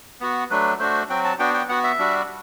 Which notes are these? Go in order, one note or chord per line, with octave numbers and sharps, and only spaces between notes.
B3 F#4
F#3 A3 D4 B4
A3 D4 F#4 C5
F#3 C4 F#4 G5
A5
B3 D4 F#4 G5
G5
B3 F#4 F#5
E5
G3 D4 F#4